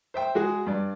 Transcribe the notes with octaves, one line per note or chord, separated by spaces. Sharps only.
C5 E5 G5
G#3 F#4 G#4
G2 D5